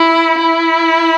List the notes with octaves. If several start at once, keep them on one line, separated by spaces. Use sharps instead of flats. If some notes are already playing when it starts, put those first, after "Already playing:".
Already playing: E4
E4